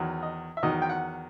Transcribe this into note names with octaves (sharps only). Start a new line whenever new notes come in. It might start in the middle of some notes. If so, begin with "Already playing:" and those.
Already playing: E2 D#3 F#3
D#5
E5
E2 D#3 F#3 D#5
G5
F#5